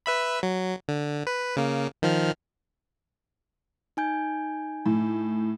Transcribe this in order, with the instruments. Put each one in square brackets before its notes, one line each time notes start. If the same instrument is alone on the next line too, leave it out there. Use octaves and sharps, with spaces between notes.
[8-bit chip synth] B4 E5 B5
F#3
D3
B4
C#3 A#3
D#3 F3 F6
[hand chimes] D#4 G#5 G6
[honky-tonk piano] A2